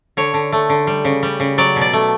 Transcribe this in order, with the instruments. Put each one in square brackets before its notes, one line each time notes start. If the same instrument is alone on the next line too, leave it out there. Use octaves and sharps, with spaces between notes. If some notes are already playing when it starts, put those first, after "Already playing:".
[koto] D3 C#5
D3
A3
D3
G3
C#3
G3
C#3
F#3 D5
B2
D5
A3